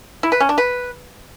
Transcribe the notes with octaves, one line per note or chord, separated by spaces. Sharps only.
E4
B4
C#4
D4
B4